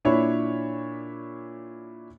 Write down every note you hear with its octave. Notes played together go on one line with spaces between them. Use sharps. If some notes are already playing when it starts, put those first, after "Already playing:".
A#2 D4 E4 C#5 B5